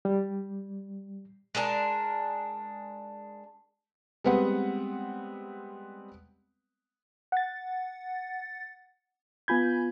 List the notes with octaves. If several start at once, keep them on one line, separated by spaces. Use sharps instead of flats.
G3
G#3 D4 A#4 A5
G3 G#3 B3 C4 B4 F#5
F#5 A6
B3 F4 G#5 B5 G6 G#6